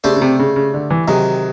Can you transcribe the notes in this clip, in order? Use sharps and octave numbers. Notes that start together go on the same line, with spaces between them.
C#3 A3 D4 G4 C5
C#3
C3
C#3
C#3
D3
E3
C3 D#3 F#3 G#3